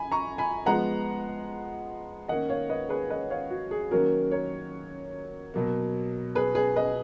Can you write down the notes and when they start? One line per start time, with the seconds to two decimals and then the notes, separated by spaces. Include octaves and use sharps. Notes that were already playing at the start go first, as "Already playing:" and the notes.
Already playing: G#5 B5
0.12 A#5 C#6
0.38 G#5 B5
0.66 F3 G#3 B3 F#5 A#5
2.28 D#3 A#3 C#4 D#5 F#5
2.49 C#5 F5
2.69 B4 D#5
2.89 G#4 B4
3.10 B4 D#5
3.30 C#5 F5
3.50 F#4
3.71 G#4
3.91 D#3 F#3 A#3 C#4 F#4 A#4
4.31 A#4 C#5
5.54 B2 F#3 A#3
6.35 G#4 B4
6.55 G#4 B4
6.76 B4 D#5